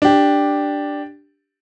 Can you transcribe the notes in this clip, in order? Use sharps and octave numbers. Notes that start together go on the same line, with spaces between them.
D4 G4